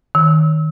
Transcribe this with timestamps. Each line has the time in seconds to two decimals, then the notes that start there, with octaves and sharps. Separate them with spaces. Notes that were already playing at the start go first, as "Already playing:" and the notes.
0.15 D#3